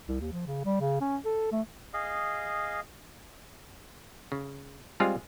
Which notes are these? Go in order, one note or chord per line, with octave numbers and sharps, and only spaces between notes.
C2
D#2
F3
C#3
G3
C#3
C#4
A4
A3
G#4 D#5 F5
C#3
G3 G#3 C4 F4 G#4 F5